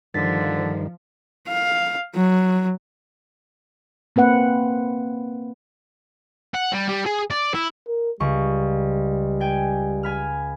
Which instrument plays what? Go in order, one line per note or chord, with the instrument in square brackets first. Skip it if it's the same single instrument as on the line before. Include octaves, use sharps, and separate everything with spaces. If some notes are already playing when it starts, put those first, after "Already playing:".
[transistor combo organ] G2 D#3 [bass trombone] D3 [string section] F3 [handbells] A6 B6
[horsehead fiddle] F5
F#3
[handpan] A#3 C4 B4 F#5
[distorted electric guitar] F#5
G3
G3
G#4
D5
E4
[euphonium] A#4
[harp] C#2 C#6 [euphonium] G3
[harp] G5 G#5
G#5 B5 F6